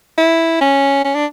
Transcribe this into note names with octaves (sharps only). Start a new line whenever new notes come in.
E4
C#4
C#4
D4